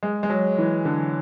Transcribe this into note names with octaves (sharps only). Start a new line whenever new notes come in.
G#3
G#3
F#3
E3
D3